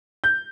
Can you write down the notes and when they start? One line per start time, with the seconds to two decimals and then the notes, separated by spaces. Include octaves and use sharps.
0.24 G6